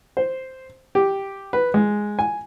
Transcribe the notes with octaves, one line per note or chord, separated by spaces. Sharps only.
C5
G4
B4
G#3
G#5